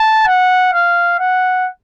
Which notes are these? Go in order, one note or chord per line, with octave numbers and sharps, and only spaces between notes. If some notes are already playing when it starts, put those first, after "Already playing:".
Already playing: A5
F#5
F5
F#5